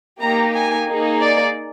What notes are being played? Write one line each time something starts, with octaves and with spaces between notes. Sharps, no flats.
A#3 D#4 G4 A#5
G#5
A#3 D#4 G#4
D5